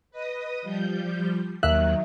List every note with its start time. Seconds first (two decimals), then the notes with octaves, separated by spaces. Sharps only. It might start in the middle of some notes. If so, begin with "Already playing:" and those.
0.11 B4 D#5 D#6
0.62 F3 G3 G6
1.63 D#2 D#3 F#3 E5 F#6